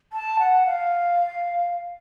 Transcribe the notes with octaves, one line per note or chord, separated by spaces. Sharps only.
A5
F#5
F5